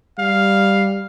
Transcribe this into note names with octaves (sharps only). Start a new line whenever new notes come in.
G3 F5